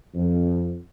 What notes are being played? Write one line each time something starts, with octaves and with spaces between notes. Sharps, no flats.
F2